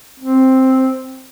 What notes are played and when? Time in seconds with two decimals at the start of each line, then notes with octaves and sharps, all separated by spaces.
0.20 C4